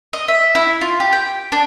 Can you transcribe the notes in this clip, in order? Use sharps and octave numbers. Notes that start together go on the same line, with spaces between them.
D#5
E5
E4
F4
G4
G5
D4